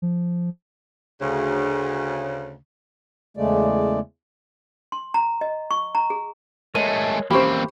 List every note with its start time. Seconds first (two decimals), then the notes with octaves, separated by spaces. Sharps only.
0.02 F3
1.21 D2 C#3
3.37 E2 C#3 G#3 A3 D5
4.92 C6
5.14 A#5
5.41 D#5
5.71 C#6
5.95 A#5
6.10 G#4
6.75 G#3 A3 A#4 C#5 D#5 D#7
7.31 E3 A#3 C4 C#4 G4 C5 B5 C#6